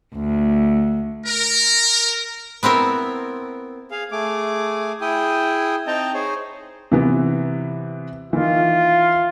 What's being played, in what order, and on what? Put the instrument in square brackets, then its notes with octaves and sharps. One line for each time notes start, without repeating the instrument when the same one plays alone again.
[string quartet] D2
[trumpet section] A#4
[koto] B3 C4 E4 A#4
[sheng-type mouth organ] G#4 F5
A3 G#4 D6
E4 G#4 G5 D#6
C4 D#4 D#5 G5 A5 A#5
D#4 G#4 C5 C#5
[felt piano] C3 E3 B3
[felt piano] D#3 E3 [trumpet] F4